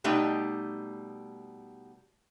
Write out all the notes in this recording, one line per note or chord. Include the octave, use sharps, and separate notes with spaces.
B2 G3 A3 D#4